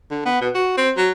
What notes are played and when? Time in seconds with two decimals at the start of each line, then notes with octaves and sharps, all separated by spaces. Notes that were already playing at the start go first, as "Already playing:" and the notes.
0.11 D3
0.25 B3
0.41 B2
0.54 F#4
0.77 C4
0.97 F#3